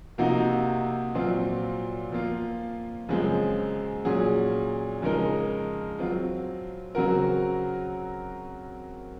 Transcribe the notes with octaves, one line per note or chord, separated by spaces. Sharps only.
C3 F3 A#3 D#4 F#4
A#2 F#3 C4 F4
F3 A#3 F4
F#2 C#3 F3 G#3 C4
A#2 F#3 C#4 G#4
F2 C#3 G#3 D#4 A#4
F#3 C4 F4
C#3 F#3 C4 F#4 A#4